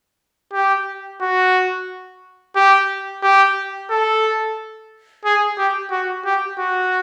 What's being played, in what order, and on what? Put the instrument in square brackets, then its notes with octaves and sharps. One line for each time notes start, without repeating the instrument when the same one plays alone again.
[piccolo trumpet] G4
F#4
G4
G4
A4
G#4
G4
F#4
G4
F#4